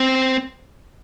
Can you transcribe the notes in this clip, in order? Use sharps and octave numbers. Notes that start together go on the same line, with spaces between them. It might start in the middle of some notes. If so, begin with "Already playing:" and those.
Already playing: C4